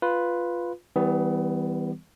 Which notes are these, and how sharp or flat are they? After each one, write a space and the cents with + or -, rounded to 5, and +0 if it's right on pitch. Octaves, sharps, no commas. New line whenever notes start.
F4 +0 B4 +0
E3 -30 G3 +0 B3 +30